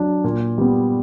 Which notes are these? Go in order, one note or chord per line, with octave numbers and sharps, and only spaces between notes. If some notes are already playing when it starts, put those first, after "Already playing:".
Already playing: F#3 D4
A#2
G3 B3